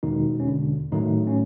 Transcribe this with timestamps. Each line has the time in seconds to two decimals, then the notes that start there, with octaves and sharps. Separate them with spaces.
0.03 E2 B2 D#3 G#3 D#4
0.40 C#4
0.47 D3 D4
0.92 A2 D#3 F#3 A3 D#4
1.27 C#4